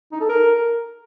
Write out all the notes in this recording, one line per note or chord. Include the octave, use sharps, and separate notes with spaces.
D#4
A4
A#4